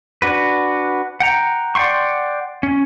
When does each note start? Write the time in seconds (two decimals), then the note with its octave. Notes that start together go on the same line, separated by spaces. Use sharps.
0.22 D4 F#4 B4
1.20 F#5 G5 A#5
1.75 D5 F#5 G5 C6 C#6
2.63 C#4